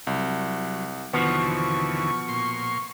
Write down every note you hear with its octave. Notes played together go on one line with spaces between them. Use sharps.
C2 F#3
D#2 B2 D3 E3 F3 B3 C#6
A#2 C6